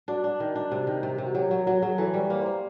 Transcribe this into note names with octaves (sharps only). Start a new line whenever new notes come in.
D4 F#4
D4
D#3
D4
C3
D#3
C3
C3
F#4
F#3 G4
F#3 F#4
F#3 F#4
F#3 G#4
E3 A4
G3
C#5
A#3
A#3 C5